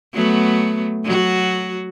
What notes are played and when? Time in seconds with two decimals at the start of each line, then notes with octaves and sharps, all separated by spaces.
0.14 F#3 A3 B3
1.04 F#3 F#4